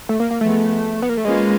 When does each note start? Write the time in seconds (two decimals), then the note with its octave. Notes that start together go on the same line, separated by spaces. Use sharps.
0.09 A3
0.20 A#3
0.31 A#3
0.41 F3 G#3 A3 B3
1.02 B3
1.09 A#3
1.17 A3
1.24 G#3 A#3 C#4 F4 G#4 B4